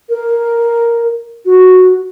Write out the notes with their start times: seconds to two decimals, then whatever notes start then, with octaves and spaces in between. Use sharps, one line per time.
0.09 A#4
1.45 F#4